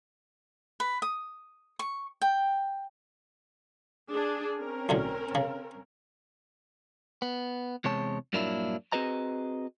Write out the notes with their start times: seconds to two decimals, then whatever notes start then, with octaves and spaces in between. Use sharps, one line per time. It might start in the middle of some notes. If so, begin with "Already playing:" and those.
0.80 B4
1.02 D#6
1.79 C#6
2.22 G5
4.11 D4 G#4
4.61 C4 C#4 A#4
4.89 B1 A2 D3
5.35 C#3
7.22 B3
7.84 E2 C3 G#3 C#5 A5
8.33 G2 A#2 F#3 A#3 D4 E4
8.92 C4 F#4 G#4 B4 D#5 A#5